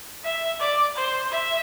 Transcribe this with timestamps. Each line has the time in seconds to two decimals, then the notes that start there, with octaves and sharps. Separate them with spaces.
0.25 E5
0.60 D5
0.96 C5
1.32 E5